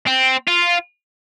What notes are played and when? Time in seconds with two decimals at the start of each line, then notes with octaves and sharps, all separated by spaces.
0.07 C4
0.48 F4